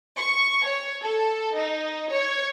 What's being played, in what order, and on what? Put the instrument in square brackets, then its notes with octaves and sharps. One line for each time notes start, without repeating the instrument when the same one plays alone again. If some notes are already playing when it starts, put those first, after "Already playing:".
[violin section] C#6
C#5
A4
D#4
C#5